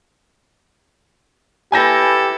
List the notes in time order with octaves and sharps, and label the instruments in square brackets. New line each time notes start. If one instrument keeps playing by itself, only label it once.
[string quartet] E4 A4 B4 [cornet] G4 [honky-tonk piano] G#5 G6 A#6